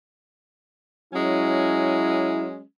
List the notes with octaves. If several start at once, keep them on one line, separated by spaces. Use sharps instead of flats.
F#3 G#3 C#4 E4